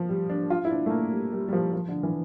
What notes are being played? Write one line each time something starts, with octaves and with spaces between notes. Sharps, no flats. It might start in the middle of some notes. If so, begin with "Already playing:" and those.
Already playing: F3
G3
D4
F4
E4
D4
A3
A#3
G3
G3
G3
F3
F3
D3
E3